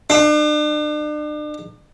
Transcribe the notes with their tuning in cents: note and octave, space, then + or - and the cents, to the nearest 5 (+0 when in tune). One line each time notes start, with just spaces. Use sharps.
D4 +40